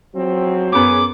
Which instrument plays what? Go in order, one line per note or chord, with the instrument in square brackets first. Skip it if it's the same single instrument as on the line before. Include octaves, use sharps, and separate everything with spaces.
[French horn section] E2 F3 C4 [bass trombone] F#3
[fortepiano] F#2 B3 [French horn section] C#4 G#4 [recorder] D6